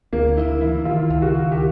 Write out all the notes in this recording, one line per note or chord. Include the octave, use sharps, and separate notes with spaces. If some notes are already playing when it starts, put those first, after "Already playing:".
D2 A#3
D2 E4
E3 E4
D#3 F4
C#2
F#4
D#3
G4